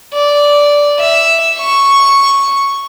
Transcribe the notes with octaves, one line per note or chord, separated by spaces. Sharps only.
D5
E5
C#6